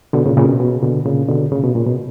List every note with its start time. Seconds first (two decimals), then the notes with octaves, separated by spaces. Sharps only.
0.13 B2 D3
0.26 A#2 C#3
0.37 A#2 C#3
0.48 B2
0.60 B2
0.83 B2 D3
1.06 A#2 C#3
1.29 B2 D3
1.52 A#2 C#3
1.63 B2
1.75 A#2
1.86 B2